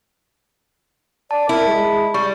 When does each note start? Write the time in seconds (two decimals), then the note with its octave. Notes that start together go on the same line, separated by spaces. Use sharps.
1.31 D5 A5
1.49 E4 A#4
1.67 G#3
2.14 G3 C#6